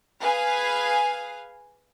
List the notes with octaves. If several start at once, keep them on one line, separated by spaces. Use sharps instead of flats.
G#4 B4 F5 G#5